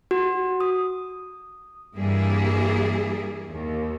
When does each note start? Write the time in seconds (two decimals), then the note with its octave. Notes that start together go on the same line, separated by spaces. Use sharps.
0.11 F#4
0.60 D#6
1.96 G2 E3 G3 A#3 E4 G#4
3.50 D#2